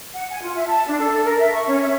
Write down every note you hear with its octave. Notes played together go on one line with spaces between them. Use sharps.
F#5
G#5
F4
E5
A5
D4
A4
A#4
E5
C#6
C#4
E5